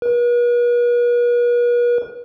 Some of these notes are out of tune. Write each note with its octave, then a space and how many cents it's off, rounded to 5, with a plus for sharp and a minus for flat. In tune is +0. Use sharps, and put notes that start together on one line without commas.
B4 -45